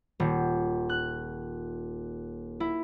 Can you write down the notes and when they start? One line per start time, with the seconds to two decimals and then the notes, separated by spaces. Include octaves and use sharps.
0.20 D#1
0.89 F#6
2.60 E4